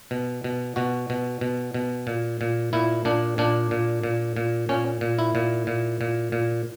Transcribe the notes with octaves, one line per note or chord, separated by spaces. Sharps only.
B2
B2
B2 F#4
B2
B2
B2
A#2
A#2
A#2 E4
A#2 D4
A#2 D4
A#2
A#2
A#2
A#2 C#4
A#2
E4
A#2
A#2
A#2
A#2